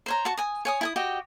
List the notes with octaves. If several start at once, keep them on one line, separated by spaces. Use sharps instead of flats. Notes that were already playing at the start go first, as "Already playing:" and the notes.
C5 C#5 A#5
F#4 A5 C#6
G#5 D#6
C#5 G#5 D#6
E4 G#5 D#6
F#4 G4 D#5 G5